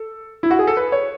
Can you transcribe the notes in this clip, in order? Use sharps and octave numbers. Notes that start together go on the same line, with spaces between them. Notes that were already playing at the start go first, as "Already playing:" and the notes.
Already playing: A4
E4
F#4
G#4
A4
B4
C#5